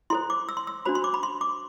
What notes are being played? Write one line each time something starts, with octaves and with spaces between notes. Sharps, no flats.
E4 A4 C5 C6
D6
E6
C6
E6
D4 F#4 C5 B5
C6
D6
B5
C6
D6